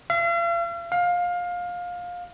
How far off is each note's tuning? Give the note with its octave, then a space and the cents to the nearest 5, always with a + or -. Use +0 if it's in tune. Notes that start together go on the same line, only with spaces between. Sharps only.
F5 -45
F5 +20